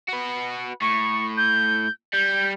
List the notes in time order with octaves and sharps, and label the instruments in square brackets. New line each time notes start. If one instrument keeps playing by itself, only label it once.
[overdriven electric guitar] F#4 B4
[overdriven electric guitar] A2 [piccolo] C#6
[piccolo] G6
[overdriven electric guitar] G3 [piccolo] G6